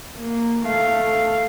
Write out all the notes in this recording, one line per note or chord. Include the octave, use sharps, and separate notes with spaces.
A#3
A3 F5